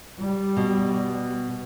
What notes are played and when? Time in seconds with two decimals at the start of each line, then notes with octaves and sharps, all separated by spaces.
0.19 G3
0.57 B2